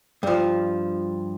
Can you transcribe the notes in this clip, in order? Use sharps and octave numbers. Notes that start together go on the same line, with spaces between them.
G2 F3